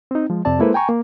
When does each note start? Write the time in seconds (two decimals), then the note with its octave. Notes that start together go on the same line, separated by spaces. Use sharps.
0.11 C4 D#4
0.30 F3 G#3
0.45 F2 C3 C4 D5 A5
0.60 G#3 A#3 E4 A4 B4 C5
0.74 G5 G#5 A#5 C#6
0.89 A#3